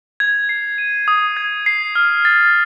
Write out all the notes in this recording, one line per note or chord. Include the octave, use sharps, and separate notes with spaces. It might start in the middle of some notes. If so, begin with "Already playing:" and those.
G#6
C7
D#7
D#6
G#6
C7
F6
A6